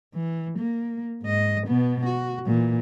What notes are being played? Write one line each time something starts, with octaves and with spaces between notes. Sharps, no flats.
E3
A#3
G#2 D#5
B2 B3
F#4
A#2 E3